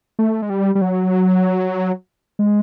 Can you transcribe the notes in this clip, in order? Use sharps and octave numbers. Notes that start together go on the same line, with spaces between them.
A3
G#3
G3
G3
F#3
G#3